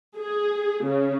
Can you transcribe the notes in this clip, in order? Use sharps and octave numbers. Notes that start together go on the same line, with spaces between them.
G#4
C#3